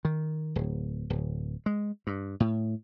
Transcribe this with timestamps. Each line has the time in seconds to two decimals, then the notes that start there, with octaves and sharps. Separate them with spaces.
0.05 D#3
0.56 D1
1.10 D1
1.66 G#3
2.07 G2
2.40 A2